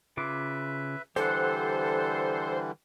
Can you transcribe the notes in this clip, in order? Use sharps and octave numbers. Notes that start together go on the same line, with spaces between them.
C#3 F4 B4 E5 D6
D3 E3 G3 G4 A4 C5 F#5